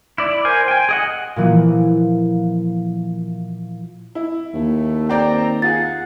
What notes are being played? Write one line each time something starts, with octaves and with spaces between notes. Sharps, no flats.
E4 D5
A#4 C5 G#5
G5 G#5
G#4 D#5 F#5
A#2 E3 F3
E4
D#2 A3
C4 D5 G5 A#5
F4 G#4 F#5 A6